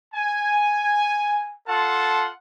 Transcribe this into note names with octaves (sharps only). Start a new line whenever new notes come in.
G#5
F4 A4 F#5 A5 C6